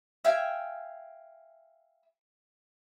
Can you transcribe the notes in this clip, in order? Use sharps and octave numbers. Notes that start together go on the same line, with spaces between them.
E5 F5 G5 G#5